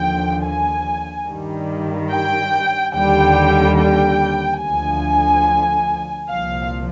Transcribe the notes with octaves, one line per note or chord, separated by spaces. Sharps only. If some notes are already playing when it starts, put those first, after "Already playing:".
Already playing: D#2 D3 F3 G5
G#5
G2 D#3 G3
G5
D#2 D3 G3 G5
G5
D2 D3 F3 G#5
C2 A#2 F3 F5